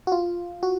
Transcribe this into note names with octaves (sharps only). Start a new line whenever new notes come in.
F#4
F4
F#4